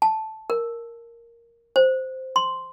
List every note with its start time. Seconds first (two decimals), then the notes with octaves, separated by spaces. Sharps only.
0.02 A5
0.50 A#4
1.76 C5
2.36 C6